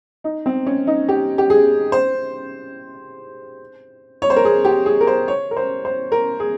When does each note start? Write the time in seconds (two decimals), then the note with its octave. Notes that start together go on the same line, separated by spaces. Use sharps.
0.24 D#4
0.46 C4
0.66 C#4
0.87 D#4
1.09 G4
1.38 G4
1.50 G#4
1.92 C5
4.22 C#5
4.30 C5
4.36 A#4
4.45 G#4
4.65 G4
4.86 G#4
5.01 A#4
5.07 C5
5.28 C#5
5.51 A#4
5.57 C5
5.85 C5
6.12 A#4
6.40 G#4